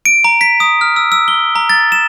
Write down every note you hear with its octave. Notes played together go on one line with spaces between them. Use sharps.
D7
A#5
B6
D#6
F6
E6
E6
G7
A#5
A6
E7